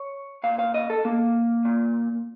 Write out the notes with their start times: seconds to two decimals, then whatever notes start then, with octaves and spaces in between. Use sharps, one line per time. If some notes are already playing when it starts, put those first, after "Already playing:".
Already playing: C#5
0.44 A#2 F5
0.59 F5
0.74 D#5
0.90 A4
1.05 A#3
1.65 A#2